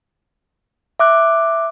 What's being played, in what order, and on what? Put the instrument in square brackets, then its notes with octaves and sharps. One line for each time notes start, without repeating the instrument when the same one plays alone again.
[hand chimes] E5 D6 F#6